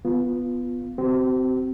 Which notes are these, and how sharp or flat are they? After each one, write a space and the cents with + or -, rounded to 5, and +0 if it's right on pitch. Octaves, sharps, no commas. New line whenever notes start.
B3 +0 F4 +0
C4 -20 F#4 +45